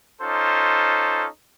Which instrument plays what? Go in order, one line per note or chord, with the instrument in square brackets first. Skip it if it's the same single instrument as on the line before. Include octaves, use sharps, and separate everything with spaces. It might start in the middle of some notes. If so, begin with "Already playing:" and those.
[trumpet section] C#4 D#4 F4 A4 C5